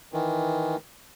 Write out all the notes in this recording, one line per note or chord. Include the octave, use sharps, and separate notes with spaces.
D#3 E3